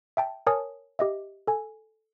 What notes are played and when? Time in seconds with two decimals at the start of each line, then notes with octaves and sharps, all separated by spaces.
0.17 E5 G5 A5
0.47 A#4 C#5 G#5 A5 D#6
0.99 G4 D#5 E5
1.47 A4 G#5